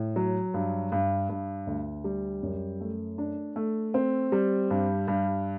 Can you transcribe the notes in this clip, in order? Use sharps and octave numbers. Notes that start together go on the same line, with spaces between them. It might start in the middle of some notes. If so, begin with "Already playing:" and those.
Already playing: A2
F#3
G2
G2
G2
D2
G3
F#2
A3
D4
A3
C4
G3
G2
G2